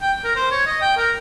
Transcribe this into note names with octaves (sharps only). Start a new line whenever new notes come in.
G5
A#4
C5
C#5
D#5
G5
A#4